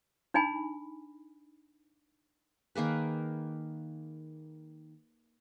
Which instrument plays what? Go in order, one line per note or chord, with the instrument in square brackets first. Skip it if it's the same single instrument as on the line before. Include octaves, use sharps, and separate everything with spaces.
[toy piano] D4 D#4 G#5 B5
[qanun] D#3 A#3 G#4 B4